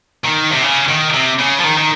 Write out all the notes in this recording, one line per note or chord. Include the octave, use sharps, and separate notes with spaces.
D#3
C3
C#3
D#3
C3
C#3
F3
D#3
D#3